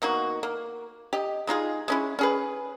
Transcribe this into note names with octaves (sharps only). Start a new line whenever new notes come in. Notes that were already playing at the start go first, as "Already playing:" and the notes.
B2 A#3 D#4 F#4
A#3
G4 D#5
G#3 D#4 F4 G#4
G#3 C#4 E4
C#4 G#4 B4